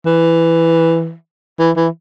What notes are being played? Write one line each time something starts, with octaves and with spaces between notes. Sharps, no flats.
E3
E3
E3